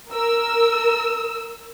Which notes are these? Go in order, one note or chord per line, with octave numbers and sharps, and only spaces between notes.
A#4 E6